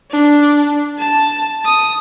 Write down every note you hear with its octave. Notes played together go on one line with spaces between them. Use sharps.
D4
A5
D#6